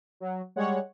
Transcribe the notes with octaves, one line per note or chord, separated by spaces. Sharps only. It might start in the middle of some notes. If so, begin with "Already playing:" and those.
F#3
G3 G#3 C#5 F#5